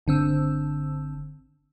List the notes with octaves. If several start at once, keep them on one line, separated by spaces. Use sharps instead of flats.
G1 D3 C4 E6